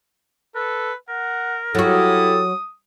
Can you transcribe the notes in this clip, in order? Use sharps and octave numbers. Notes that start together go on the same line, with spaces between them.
A4 B4
A#4 F#5
F#3 E4 F#4 G4 A4 D#6